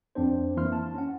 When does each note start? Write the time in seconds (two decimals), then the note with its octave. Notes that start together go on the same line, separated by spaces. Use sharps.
0.15 F2 C4 D4 C5
0.56 E3 A#3 E4 C6 F6
0.72 A5
0.94 C#4 F#5